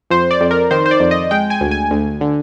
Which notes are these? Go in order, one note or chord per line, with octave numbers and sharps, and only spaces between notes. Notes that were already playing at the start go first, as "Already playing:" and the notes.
F2 C5
D5
F2
A#4
D#3 C5
C5
D5
F2
D#5
G#3 G5
G#5
D2
G#5
D2
D3